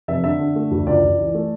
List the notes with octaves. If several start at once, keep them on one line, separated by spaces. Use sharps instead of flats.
F1 E5
D3 E5
D3
A3
D2
C#2 D5
C#2
E3
A3